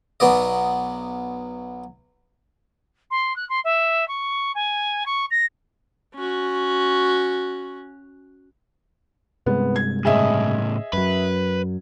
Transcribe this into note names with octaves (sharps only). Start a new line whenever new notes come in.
B1 F#3 B3 D5 D#5
C6
F#6
C6
E5
C#6
G#5
C#6
A#6
C#4 F#4
G2 C3 G#3 B3
G#6
A2 C#3 G#4 D#5 E5
F#2 F#3 B4